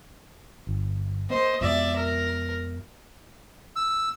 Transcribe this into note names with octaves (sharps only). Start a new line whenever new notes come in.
G1
A#3 B3 C5 D#5
F2 B2 G#3 D5 E5
A#4
E6